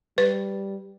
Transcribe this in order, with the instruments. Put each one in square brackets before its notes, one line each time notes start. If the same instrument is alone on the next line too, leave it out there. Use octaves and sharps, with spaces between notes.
[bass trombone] G3 [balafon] B4